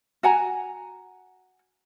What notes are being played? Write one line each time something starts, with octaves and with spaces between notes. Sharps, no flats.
F#4 F#5 G#5 A#5